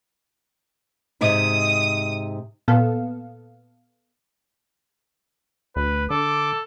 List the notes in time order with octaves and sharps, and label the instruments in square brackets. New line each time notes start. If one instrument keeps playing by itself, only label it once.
[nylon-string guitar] G#2 C3 D#4 [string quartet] D#6
[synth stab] A#2 B3 A4 F5
[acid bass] D2 [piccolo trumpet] B4
[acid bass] D3 [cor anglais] A4 [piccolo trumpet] D6